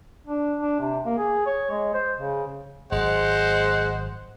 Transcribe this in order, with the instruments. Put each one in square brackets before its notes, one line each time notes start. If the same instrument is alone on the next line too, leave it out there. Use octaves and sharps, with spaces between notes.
[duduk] D4
D4
C3
A#3
G#4
C#5
G#3
C5
C#3
[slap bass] G#1 F#3 [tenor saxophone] G#3 [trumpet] C5 [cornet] F#5